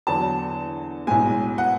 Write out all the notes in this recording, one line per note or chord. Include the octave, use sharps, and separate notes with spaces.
E2 D3 F#3 A5
B1 A2 G#3 G#5
F#5